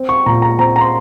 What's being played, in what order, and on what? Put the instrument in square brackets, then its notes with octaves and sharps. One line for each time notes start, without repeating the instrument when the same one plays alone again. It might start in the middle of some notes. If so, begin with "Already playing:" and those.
Already playing: [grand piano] C4
C#6
A#2 A#5
A#5
C4 A#5
A#5
C6